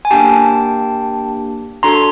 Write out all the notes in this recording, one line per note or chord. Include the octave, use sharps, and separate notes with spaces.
G#5
A#3 D4 G4 G5 A5
D4 F#4 A4 A#5 C6